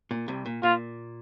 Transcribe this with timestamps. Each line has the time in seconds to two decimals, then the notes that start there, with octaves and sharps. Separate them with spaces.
0.11 A#2
0.28 C2 C3
0.46 A#2
0.63 A#2 F4